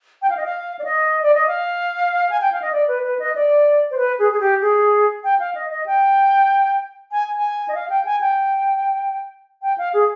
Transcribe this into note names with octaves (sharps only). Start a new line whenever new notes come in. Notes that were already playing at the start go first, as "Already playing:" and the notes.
G5
F5
D#5
F5
D5
D#5
D5
D#5
F5
G#5
G5
F5
D#5
D5
B4
B4
D#5
D5
C5
B4
G#4
G#4
G4
G#4
G5
F5
D#5
D#5
G5
G#5
G#5
D#5
F5
G5
G#5
G5
G5
F5
G#4